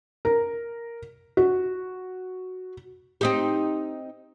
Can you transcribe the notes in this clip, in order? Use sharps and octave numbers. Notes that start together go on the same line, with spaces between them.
A#4
F#4
C4 D#4 G4